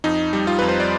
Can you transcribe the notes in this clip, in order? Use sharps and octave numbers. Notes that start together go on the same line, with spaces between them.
F2 D#4
G3
F4
F2 B4
C5
D5